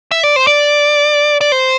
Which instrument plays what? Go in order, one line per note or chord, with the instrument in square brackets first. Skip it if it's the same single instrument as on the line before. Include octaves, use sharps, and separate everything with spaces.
[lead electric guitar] E5
D5
C5
D5
D5
C5